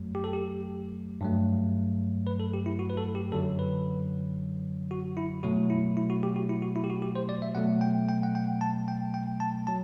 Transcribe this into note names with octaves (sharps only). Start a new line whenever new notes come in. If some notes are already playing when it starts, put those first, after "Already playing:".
Already playing: F#2 F#3 A3
G4
A4
G4
G2 F#3 A3
B4
A4
G4
E4
F#4
B4
A4
G4
F#2 D3 F#3 A4
B4
F#4
E4
B2 F#3 A3 F#4
E4
E4
F#4
G4
F#4
E4
F#4
E4
G4
F#4
G4
C5
D5
E5
B2 F#3 A3 F#5
G5
G5
F#5
G5
A5
G5
G5
A5
F#3 A5